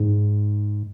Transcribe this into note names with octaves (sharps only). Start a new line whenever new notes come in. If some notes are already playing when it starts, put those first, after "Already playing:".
Already playing: G#2